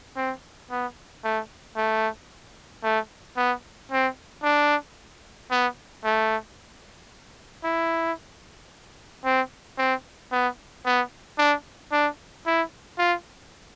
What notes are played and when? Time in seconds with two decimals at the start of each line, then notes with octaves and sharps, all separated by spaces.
0.16 C4
0.71 B3
1.24 A3
1.76 A3
2.83 A3
3.37 B3
3.91 C4
4.44 D4
5.51 B3
6.04 A3
7.64 E4
9.25 C4
9.78 C4
10.32 B3
10.86 B3
11.38 D4
11.92 D4
12.46 E4
12.98 F4